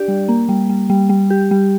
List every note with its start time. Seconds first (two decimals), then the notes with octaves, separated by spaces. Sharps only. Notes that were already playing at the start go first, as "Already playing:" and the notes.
Already playing: D4 G4 D5
0.08 G3
0.28 A#3
0.49 G3
0.70 G3
0.90 G3
1.09 G3
1.30 G4
1.51 G3